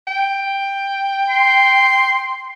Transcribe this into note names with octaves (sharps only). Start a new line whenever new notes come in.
G5
C6